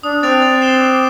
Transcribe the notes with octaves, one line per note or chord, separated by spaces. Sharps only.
D4 D#6
C4 F#6 A6 D7 F7
A6
C7 E7 G7
D6